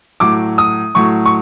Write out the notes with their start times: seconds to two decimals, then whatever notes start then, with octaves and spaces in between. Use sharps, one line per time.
0.20 A2 F#3 D6
0.58 D#6
0.95 A2 F#3 C#6
1.26 C#6